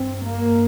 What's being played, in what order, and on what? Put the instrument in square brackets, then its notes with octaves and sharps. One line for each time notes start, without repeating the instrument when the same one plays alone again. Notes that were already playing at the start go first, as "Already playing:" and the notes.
Already playing: [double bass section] G2 C4
A#3